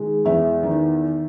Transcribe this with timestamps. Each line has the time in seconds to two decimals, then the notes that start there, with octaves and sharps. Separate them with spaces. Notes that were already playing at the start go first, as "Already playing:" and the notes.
Already playing: D#3 G#3
0.25 E2 E5
0.63 D#3